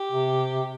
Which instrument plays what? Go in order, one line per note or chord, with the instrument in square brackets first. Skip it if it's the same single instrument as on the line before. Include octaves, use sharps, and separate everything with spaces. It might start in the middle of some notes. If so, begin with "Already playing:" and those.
Already playing: [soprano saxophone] G4
[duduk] C3